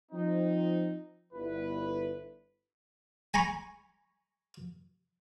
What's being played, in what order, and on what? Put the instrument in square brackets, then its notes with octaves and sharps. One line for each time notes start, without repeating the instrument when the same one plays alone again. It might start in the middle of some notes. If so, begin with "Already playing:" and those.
[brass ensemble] F3 C4 D#4
G1 E4 B4
[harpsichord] G#5 A#5 B5 C#6